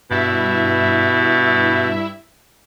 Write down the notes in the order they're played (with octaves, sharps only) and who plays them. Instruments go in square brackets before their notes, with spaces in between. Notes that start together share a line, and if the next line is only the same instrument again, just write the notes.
[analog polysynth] G2 E4 E5 [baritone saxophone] B2